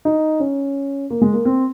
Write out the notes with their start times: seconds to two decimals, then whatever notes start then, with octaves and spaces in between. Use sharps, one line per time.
0.05 D#4
0.40 C#4
1.10 A#3
1.22 G#3
1.34 A#3
1.45 C4